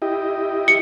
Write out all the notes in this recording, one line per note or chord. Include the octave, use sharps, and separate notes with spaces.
E4 G4 D#5
C#7